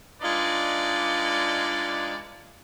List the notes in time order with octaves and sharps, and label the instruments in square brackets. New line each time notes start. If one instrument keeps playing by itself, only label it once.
[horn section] G#3 D4 D#4 F4 B4 D5